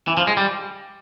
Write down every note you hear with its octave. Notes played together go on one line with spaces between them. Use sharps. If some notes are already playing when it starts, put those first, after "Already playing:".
E3
F3
G#3
G3